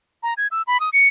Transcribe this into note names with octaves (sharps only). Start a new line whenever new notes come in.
A#5
G#6
E6
B5
D#6
C#7